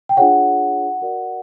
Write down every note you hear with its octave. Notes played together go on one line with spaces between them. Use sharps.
G5
D4 F4 G#4 C#5 F#5
F#4 A#4 D5